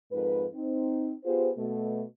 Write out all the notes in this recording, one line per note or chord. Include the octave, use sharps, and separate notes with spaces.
F2 G#2 A#4 B4
C4 D#4
B3 F4 G4 G#4 C5
B2 A3